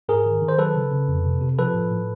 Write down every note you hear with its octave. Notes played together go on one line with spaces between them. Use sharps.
G#2 G#4 A#4
D#3
D#3
C5
F#3 A4 B4
C#3
C#3
F2
C3
C3
F3 A4 B4
A2
A2